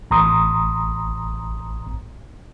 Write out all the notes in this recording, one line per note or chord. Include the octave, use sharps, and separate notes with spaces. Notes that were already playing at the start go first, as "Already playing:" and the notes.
A1 A#5 C6 D#6